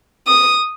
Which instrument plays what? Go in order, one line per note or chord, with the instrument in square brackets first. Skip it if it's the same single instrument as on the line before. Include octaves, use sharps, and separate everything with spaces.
[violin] D#6